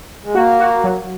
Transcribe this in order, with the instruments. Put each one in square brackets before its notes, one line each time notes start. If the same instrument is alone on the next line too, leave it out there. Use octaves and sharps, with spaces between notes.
[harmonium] G#3
[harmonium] A#3 [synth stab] F#4
[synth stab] F#4
F#3